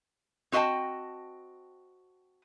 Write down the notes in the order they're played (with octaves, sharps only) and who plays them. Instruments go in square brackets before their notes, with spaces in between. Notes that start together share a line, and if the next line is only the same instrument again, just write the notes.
[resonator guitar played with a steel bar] C4 F#4 D#5 F5 G5 A5